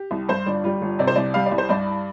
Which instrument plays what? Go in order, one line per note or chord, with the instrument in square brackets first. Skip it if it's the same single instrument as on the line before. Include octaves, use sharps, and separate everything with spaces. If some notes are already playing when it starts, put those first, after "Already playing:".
Already playing: [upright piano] G4
C2
G2 C5
G1 D4
G3 F4
G1
C3 D5
C5
C2 D5
G3 F5
D5
C2
C5
G2 D5